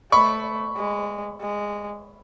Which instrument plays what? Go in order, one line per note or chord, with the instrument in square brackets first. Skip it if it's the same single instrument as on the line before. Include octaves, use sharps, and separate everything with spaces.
[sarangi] A3 [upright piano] B5 C#6
[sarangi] G#3
G#3